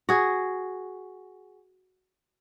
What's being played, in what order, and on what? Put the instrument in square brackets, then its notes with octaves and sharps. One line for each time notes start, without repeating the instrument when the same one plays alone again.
[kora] F#4 G#4